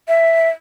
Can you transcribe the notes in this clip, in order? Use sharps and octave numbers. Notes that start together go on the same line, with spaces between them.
E5